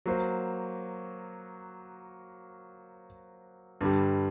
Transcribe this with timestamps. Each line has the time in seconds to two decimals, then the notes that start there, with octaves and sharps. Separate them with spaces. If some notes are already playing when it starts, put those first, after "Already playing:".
0.06 F#3 A#3 F#4 C5
3.81 G2 D3 G3